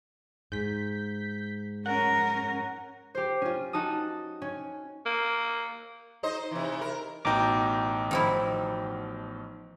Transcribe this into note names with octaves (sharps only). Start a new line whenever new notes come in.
G#2 G6 B6
C#4 A#4 F#5
G4 C5
C#4 F4
D#4 F#4 A5 D#6
C#4
A#3
D#4 C5 D#5
C3 E3
A#4
A1 B2 D#4 G5 A#5 D6
D#3 F3 E4